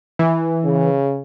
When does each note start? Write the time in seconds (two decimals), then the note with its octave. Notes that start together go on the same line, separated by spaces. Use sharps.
0.19 E3
0.64 C#3